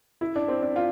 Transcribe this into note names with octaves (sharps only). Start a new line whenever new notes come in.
E4
D4
C4
D4
F4